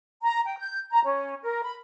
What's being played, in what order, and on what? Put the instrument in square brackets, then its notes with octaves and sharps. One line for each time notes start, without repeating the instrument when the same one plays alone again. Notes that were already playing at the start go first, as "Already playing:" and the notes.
[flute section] A#5
G5
G6
A#5
C#4
A#4
B5